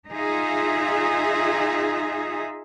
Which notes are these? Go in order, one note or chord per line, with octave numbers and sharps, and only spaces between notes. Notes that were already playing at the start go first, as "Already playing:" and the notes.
D#4 F4 G#4 E5